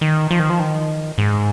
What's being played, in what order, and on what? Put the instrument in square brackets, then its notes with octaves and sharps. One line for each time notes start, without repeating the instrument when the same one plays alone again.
[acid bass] D#3
F3
D#3
F3
D#3
G#2